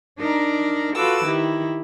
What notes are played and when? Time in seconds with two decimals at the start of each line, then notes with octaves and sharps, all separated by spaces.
0.19 D4 D#4 A#4 D5
0.95 F4 F#4 A4 B4 D6 E6
1.25 D#3 E4 G4